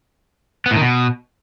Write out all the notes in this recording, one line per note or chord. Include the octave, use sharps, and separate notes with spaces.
B3
A2
D#3
B2